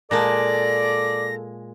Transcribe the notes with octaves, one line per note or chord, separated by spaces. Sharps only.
A#2 G#3 A4 D5 A5 A#6